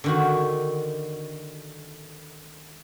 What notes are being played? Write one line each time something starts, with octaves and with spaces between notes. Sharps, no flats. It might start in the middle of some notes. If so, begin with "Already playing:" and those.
D3 D#3 F#4